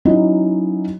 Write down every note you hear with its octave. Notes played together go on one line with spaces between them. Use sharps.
F#3 C#4 D#4 E4 D#5